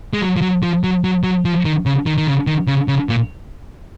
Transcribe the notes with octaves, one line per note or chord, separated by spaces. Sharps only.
G#3
F#3
F3
F#3
F3
F#3
F#3
F#3
F3
D#3
C#3
D#3
D#3
C#3
D#3
C#3
C#3
A#2